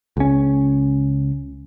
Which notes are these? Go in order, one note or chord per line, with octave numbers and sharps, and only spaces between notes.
C#2 C#4